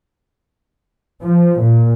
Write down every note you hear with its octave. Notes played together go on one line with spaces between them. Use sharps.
F3
A#2